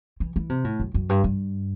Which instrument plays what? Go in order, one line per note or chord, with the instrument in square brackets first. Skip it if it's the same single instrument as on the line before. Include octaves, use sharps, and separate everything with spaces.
[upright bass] E3
E3
C3
A2
F#2
F#2
G2
G2